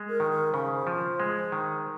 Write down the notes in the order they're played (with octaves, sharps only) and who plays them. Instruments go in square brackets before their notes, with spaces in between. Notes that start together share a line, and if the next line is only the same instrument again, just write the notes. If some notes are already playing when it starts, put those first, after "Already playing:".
Already playing: [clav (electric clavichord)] G#3
[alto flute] A#4
[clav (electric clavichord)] D#3
[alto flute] A#4
[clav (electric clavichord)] C#3 [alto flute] C5
[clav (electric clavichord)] F3
G#3
D#3